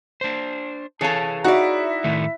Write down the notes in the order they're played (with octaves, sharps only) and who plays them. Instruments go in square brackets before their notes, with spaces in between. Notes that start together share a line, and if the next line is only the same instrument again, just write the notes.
[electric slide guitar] D4 C5
[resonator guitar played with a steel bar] E3 A4 [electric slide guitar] G#4 C#5 F5 [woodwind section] A5
[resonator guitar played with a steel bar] D#4 D5 [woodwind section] E4 E5 [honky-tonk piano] F#4
[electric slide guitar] A2 D#3 A3